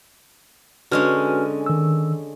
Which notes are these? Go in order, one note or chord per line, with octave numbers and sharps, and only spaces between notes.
D3 G#3 C#4 F#4 B4 F6
D#3 E6